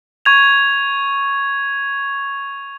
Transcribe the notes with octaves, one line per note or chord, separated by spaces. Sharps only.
C#6 G#6 F7